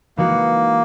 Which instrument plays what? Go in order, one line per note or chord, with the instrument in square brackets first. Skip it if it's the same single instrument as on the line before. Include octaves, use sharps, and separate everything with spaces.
[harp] E3 G#3 D#4 F#4 [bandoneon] A#3